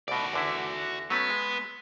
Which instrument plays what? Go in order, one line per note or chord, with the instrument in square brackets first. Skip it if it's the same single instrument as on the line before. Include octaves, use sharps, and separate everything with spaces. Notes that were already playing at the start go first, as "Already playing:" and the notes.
[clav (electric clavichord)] C2 B2 [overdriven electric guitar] F#4 D5
[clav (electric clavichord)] E2 D3 E4
[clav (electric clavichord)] F#3 A3 C#4 [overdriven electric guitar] B3 B4
[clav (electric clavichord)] G#3